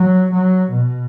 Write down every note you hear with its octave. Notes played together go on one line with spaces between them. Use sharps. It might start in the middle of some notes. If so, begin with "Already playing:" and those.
Already playing: F#3
F#3
B2